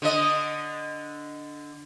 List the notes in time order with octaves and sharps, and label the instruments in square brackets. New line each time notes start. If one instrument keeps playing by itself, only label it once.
[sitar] D3 D#5